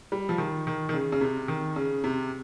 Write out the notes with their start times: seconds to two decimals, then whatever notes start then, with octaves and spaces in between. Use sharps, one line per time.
0.12 G3
0.29 F3
0.38 D#3
0.67 D#3
0.89 D#3
0.94 C#3
1.12 C#3
1.21 C3
1.48 D#3
1.76 C#3
2.04 C3